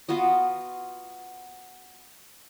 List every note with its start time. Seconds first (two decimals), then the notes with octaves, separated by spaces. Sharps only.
0.09 B3 F4 F#4 D#5